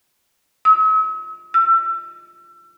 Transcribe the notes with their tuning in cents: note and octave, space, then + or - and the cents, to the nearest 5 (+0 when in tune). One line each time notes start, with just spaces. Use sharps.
E6 -45
E6 +30